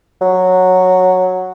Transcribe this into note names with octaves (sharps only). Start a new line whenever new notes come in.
F#3